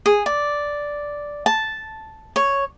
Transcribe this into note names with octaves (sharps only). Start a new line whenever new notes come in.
G#4
D5
A5
C#5